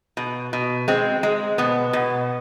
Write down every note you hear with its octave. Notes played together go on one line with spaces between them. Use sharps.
B2
B2
G#3 C4
G#3
B2 B3
B2